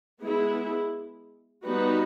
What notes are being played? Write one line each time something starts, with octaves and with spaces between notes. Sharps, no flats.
G#3 B3 E4 G#4
G3 B3 D#4 F#4 B4